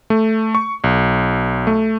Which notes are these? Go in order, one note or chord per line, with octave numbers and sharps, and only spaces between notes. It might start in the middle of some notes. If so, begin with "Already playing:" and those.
A3
C#6
B1
A3